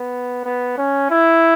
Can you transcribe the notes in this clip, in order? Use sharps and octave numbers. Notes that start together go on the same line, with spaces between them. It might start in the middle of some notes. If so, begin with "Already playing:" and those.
Already playing: B3
B3
C#4
E4